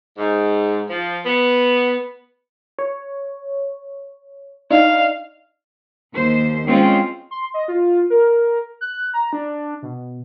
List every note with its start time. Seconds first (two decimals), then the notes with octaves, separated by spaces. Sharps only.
0.18 G#2
0.90 F3
1.26 B3
2.79 C#5
4.70 D4 D#4 F5
6.14 D#2 C5
6.67 G#3 C4 C#4 F4
7.31 C6
7.54 D#5
7.68 F4
8.10 A#4
8.81 F#6
9.14 A#5
9.33 D4
9.82 B2